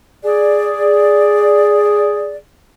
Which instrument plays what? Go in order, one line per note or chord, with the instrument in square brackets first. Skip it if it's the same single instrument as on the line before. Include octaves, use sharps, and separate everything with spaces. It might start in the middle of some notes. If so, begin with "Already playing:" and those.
[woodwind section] G#4 D5